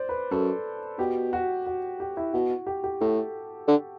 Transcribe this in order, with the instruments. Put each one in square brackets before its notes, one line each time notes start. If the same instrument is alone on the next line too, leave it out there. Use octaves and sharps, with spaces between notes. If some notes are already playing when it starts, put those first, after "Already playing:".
Already playing: [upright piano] C5 D5
B4
[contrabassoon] F#2 [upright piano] A4
[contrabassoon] B2 [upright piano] G4
[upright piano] F#4
F#4
G4
E4
[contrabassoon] B2 [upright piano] F#4
[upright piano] G4
G4
[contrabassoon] A2 [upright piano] A4
[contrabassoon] D3